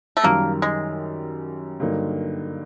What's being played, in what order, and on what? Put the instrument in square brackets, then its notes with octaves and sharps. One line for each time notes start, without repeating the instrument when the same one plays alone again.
[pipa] A3
[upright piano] F#2 D#3 G3 [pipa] A#3
[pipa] G#3
[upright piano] G2 D3 F#3 A#3 D#4